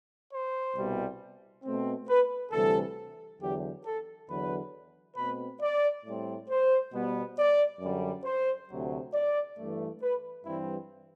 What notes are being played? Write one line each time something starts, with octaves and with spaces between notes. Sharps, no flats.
C5
C2 B2 G3
B2 A3 C4
B4
D2 C3 E3 G3 A4
E2 D3 F#3 G4
A4
E2 D3 F#3 B4
B2 A3 C4 B4
D5
A2 G3 C4
C5
B2 G3 B3
D5
F#2 D3 G3
C5
D2 C3 F#3
D5
G2 E3 A3
B4
G2 E3 G3 C4 E4